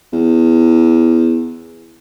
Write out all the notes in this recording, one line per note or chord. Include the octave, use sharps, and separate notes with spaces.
E2